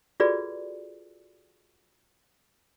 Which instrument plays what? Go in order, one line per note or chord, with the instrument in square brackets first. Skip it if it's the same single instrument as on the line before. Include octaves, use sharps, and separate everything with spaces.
[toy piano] F4 F#4 G#4 A4 B4 D5